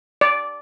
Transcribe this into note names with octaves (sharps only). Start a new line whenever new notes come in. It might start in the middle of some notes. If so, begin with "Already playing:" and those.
D5